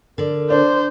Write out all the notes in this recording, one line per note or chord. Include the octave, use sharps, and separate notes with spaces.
D3 A#4 D5
D4 C5